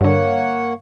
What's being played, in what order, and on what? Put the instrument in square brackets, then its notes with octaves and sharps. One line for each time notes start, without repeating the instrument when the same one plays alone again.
[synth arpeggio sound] G2 D3 [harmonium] A#3 C#5 F#5